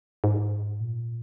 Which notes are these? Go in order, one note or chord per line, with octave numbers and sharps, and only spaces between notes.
G#2
A#2